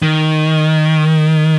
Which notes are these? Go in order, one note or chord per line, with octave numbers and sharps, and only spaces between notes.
D#3